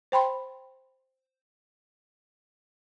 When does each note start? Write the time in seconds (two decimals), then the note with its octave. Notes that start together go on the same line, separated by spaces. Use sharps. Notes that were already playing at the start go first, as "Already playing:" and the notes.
0.12 C5 G5 B5 C6